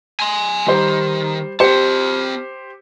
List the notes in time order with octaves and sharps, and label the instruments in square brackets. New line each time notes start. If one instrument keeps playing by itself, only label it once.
[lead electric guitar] G#5 C6
[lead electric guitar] D#3 [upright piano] G3 C5
[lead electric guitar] C4 A5 [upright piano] G4 C5 C#7